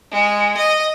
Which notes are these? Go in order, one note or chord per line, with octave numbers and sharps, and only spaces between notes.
G#3
D#5